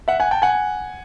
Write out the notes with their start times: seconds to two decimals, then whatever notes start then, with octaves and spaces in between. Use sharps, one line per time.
0.08 E5 F#5
0.20 F#5 G#5
0.31 G5 A5
0.42 F#5 G#5